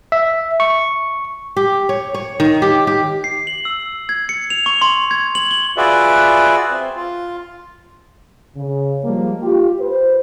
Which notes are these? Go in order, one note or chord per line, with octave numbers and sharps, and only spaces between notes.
E5
C#6
G4
C#5
C#5
D#3
G4
G4
C7
F#7
E6
G#6
C#7
F7
C#6
C6
G#6
F#7
G7
F4 F#4 G#4 B4 D5 E5
C4
F4
C#3
F3 G3 G#3 A#3
F4 G4
B4 C5